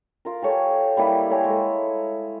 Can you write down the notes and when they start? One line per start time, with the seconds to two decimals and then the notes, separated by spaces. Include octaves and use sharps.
0.25 F4 A#4
0.42 G4 A4 C#5 G#5
0.97 G3 A#3 E4
1.30 A#4 C#5 G5 G#5
1.44 G#3 A4